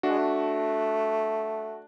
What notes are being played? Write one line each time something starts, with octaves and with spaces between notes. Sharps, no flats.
A3 D4 F#4
G#3
A3